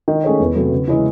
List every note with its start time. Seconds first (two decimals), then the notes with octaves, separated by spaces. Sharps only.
0.08 D#3
0.24 A3 C#4 G#4 C#5
0.40 E2
0.55 C3 F#3 A3
0.72 C#3
0.88 E3 G#3 C#4 E4